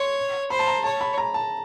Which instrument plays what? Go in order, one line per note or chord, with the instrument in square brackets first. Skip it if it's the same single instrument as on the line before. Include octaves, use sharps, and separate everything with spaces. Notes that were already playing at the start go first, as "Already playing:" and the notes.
Already playing: [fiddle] C#5 [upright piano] C6
[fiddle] C5 [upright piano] B5
[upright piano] A5
A#5
[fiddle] C#5 [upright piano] A5
[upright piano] B5
A#5
A5